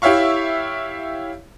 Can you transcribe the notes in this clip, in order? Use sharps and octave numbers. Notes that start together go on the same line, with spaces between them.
E4 G4 C#5 E5 F5 C#6